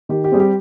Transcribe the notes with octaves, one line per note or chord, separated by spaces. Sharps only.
D#3 G4
G4
G3 C4 G#4
G4